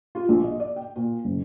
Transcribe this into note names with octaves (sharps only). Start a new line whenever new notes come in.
F4
A#1
D#5
D5
G5
A#2
F#1